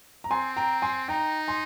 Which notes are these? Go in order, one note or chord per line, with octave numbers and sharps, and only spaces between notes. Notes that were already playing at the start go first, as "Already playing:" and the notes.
A#5
C4 G#5 C6
G5 A#5
G#5 C6
D#4 G5 A#5
G#5 C6